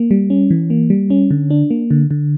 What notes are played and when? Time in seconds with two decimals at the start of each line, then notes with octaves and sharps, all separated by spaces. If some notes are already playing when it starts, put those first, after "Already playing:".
Already playing: A#3
0.11 G3
0.30 C#4
0.51 E3
0.70 A#3
0.90 G3
1.10 C#4
1.31 D3
1.50 D4
1.71 A#3
1.91 D3
2.11 D3